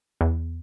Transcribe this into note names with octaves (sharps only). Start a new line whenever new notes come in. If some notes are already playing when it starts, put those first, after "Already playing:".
E2